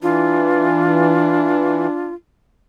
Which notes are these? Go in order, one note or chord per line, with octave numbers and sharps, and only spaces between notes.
E3 D4 F4